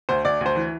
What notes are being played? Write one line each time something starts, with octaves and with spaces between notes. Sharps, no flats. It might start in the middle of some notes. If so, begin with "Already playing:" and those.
D2 C5
D2 D5
D2 C5
E3